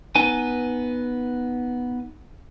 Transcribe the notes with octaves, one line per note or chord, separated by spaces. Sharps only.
B3 D#4 B4 G#5